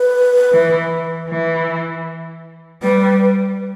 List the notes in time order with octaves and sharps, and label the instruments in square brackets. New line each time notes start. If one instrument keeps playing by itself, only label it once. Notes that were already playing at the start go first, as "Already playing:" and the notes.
Already playing: [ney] B4
[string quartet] E3
E3
[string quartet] G3 [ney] B4